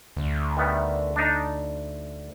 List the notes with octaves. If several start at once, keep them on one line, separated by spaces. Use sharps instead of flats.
D2
D#3 G3 B3
D4 D#4